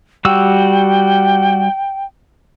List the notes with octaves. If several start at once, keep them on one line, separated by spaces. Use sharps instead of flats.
G3 F#4 G5 E6